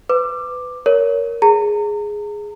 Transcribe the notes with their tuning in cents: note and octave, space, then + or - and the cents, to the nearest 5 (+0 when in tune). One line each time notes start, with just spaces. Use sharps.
B4 +20 D6 +10
A#4 +0 C#5 +20
G#4 +0 A#5 -35